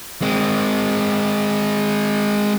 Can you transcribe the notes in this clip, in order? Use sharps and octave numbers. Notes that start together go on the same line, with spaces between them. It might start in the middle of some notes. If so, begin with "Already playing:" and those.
G#3 C4